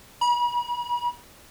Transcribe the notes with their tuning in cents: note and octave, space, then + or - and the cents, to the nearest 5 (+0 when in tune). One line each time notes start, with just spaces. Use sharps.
B5 -40